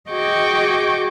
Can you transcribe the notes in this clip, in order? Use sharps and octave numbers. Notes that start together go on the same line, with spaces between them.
F#4 G#4 D#5 G5 C#6 D6